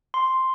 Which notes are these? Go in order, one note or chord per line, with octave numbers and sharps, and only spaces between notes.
C6